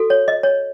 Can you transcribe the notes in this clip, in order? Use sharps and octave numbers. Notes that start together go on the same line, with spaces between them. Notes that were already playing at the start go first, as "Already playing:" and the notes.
Already playing: F#4 A4
C#5
D#5
C#5